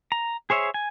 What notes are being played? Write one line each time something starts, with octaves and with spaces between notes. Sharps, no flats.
A#5
G#4 C5 C#5 E5
G#5